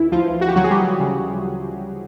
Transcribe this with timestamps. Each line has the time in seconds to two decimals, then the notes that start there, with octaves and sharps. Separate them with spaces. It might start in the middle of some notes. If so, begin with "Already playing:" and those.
Already playing: D2 D3 E3 E4
0.12 D2 F3 F4
0.41 F#4
0.48 G4
0.56 D2 F#3 F#4
0.64 G#4
0.70 G3 G4
1.00 C#3